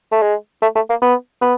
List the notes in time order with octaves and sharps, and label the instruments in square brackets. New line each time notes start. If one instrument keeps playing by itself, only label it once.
[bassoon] A3
G#3
A3
A3
A#3
B3
B3